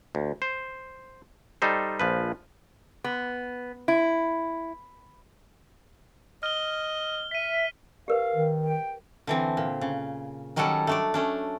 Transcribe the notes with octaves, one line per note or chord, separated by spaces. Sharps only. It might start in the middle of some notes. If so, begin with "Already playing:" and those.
D2
C5
G3 D#4 A4 C5
A#1 F3 B4
B3
E4
D#5 F6 G7
E5 B6 D#7
G4 A#4 B4 F5
D#3
G5
D3 E3 C4
A#2
C#3
D#3 F#3 G3 C#4 A4 F#5
A3 D4 D5
A3 C#4 D4